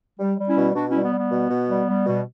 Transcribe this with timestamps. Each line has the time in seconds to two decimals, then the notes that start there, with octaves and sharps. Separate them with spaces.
0.19 G3
0.38 G3
0.47 C#4 E4
0.57 B2
0.75 B2 D4 F#4
0.90 G3 C#4 E4
1.03 B3
1.12 G3
1.18 B3
1.32 B2
1.50 B2
1.69 G3
1.88 G3
2.06 B2